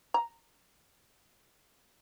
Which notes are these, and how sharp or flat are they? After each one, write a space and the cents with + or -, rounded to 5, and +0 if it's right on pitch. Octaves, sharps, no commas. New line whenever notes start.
A#5 -5